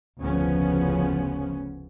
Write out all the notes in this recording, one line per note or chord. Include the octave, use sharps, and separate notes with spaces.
F1 D2 C#3 F3 B3 C#4